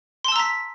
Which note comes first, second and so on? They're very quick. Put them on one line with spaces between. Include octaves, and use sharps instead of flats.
C6 A5 E6 A#5 B6